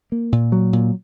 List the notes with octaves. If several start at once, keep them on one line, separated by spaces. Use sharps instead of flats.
A#3
A#2
F#3
A#2